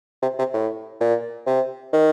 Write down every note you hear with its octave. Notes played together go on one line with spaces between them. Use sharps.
C3
C3
A2
A#2
C3
D#3